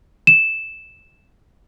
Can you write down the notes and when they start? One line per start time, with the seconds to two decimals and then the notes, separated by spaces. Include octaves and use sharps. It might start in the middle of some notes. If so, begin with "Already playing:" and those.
0.27 E7